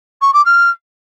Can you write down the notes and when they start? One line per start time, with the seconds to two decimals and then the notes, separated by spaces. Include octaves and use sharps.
0.21 C#6
0.33 D6
0.45 F6